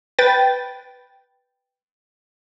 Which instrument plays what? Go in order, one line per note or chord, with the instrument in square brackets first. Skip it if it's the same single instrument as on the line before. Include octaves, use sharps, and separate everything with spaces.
[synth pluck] B4 G5 A6